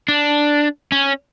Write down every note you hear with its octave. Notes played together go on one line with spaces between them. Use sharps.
D4
C#4